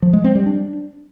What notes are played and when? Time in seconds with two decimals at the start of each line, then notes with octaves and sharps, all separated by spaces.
0.02 F3
0.13 G#3
0.24 C4
0.35 G3
0.46 D4